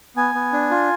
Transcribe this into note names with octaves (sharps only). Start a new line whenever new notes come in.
B3 G#5
B3
D4
F4